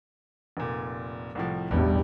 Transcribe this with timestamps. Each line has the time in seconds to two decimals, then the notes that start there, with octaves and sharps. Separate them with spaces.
0.57 F1 A#2
1.35 C2 A2 F3
1.71 A1 E2 G2 B2 G3